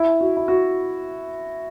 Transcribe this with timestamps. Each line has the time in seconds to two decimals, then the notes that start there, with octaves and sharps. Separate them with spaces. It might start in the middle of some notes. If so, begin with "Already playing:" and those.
Already playing: E4
0.20 F#4
0.37 E4
0.48 F#4